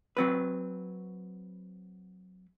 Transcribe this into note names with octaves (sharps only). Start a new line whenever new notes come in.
F#3 C4 B4